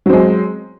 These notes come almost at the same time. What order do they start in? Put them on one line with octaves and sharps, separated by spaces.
F#3 C4 G#3